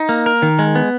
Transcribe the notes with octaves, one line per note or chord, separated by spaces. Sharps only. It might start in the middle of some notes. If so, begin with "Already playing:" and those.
Already playing: D#4
A#3
A#4
D#3
G#3
B3